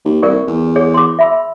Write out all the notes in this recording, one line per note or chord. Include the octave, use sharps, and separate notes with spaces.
D#2
C2 A#4 D5 C#6
E2
G#4 C#5
C6 D6
E5 B5 E6